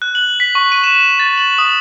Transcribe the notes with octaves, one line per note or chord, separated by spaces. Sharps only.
F#6
F#7
B6
C#6
D#7
E7
A6
F#7
D#6